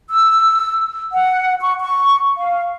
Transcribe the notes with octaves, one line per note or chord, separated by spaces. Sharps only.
E6
F#5
C#6
C#6
F5